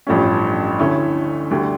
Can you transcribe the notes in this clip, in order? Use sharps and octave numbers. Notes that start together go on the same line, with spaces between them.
A1 G2 F3 A3 C#4
D2 D3 A3 C#4 E4
D2 D3 G3